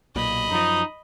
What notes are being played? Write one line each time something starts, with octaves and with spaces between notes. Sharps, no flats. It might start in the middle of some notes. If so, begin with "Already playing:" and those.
B1 A#2 D#5 B5
F#2 F3 D#4